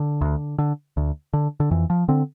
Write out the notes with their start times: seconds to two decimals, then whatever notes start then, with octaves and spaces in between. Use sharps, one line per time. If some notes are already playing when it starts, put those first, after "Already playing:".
Already playing: D3
0.21 D2
0.59 D3
0.97 D2
1.33 D3
1.60 D3
1.71 F2 E3
1.90 F3
2.08 D3 C4